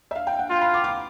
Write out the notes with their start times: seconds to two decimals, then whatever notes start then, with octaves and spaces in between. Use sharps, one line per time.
0.11 E5
0.15 F5
0.27 G5
0.39 F#5
0.50 F4 F5
0.61 B5
0.74 D6
0.84 D6